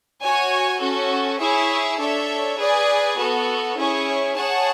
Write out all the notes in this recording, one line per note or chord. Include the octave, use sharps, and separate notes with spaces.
F#4 C#5 G#5
C#4 F#4 A4
E4 G#4 C#5 E5
D4 A4 C#5 E5
G#4 B4 D5 G#5
B3 F#4 A4
C#4 E4 G#4 C#5
G#4 C#5 F#5 A5